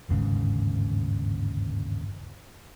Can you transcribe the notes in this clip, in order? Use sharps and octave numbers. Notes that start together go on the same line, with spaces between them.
G1 D#2 G#2 C#3